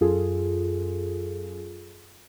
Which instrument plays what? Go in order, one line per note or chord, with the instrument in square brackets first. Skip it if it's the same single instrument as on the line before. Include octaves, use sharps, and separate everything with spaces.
[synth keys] F#2 F4 G#4 A4